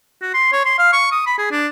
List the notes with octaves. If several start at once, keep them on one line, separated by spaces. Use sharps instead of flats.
F#4
C6
C#5
C6
F5
C#6
D#6
B5
G#4
D4